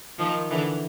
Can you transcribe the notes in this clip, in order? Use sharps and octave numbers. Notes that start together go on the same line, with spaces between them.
D#3 F3
D3 E3